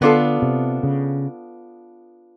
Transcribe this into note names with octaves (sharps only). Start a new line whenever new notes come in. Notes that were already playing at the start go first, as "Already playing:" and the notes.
D3 B3 D4 F4 A4
C3
C#3